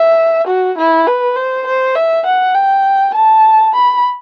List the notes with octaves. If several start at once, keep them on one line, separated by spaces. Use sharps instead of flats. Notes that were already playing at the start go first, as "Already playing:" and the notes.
Already playing: E5
F#4
E4
B4
C5
C5
E5
F#5
G5
A5
B5